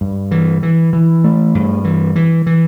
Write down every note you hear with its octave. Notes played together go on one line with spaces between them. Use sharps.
G2
E3
E3
E3
A3
G2
E3
E3
E3